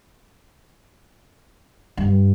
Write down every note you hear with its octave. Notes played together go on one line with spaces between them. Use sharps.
G2